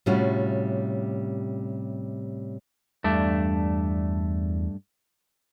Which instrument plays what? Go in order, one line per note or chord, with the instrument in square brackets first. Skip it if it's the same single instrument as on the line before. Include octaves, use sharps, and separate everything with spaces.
[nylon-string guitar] A2 C3 G3 C#4 F4 F#4
[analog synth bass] E2 [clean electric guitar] G2 A3 D4